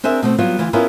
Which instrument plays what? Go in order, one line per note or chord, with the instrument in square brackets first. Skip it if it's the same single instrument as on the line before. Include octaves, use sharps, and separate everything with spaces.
[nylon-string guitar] C4 D4 G#4 A#4 E5
B2 A3 C4
F#3 G3 B3 F4
D2 E3 F4
B3 C#4 E4 F4 G#4 A#4